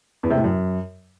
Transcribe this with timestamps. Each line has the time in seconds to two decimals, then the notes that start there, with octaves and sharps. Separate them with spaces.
0.23 E2
0.30 C3
0.37 A2
0.44 F#2